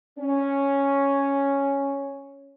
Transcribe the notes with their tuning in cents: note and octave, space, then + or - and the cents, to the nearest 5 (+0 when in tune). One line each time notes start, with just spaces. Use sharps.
C#4 +0